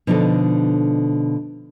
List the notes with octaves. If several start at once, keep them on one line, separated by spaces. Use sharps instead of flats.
B2 D3 F3 D4 D#4 A4